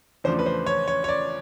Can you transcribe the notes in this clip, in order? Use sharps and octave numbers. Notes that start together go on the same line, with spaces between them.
E2 C#3 F3 A3 D4 C5
B4
C5
C#5
C#5
C#5
D5